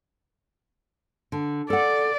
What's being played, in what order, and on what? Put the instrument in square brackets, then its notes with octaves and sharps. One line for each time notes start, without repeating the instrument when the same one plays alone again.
[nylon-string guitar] D3
[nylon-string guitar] A4 F#5 [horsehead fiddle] D5